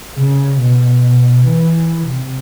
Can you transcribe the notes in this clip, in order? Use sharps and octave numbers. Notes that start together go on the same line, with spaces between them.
C#3
B2
E3
C3